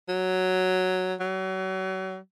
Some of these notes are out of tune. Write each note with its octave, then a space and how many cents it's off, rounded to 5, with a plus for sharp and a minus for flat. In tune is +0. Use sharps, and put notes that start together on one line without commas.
F#3 +0
F#3 +35